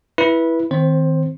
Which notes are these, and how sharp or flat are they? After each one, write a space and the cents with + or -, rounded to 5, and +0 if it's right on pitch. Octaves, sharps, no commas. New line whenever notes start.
E4 +0 B4 -15
D#3 +20 C4 -15 C5 +15